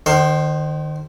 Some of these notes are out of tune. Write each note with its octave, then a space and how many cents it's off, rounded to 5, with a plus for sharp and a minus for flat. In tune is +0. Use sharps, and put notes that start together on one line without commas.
D#3 -30 C5 +10